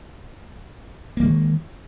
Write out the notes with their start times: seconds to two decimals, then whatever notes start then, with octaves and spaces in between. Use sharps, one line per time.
1.17 A#3
1.20 E3
1.22 G#3
1.25 D#3